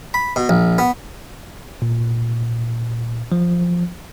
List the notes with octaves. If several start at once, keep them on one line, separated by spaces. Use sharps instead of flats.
B5
B2
A#1
B3
A#2
F3